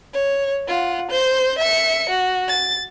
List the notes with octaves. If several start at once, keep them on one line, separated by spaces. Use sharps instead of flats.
C#5
F4 F#5
C5 G6
E5 C#7
F#4
A6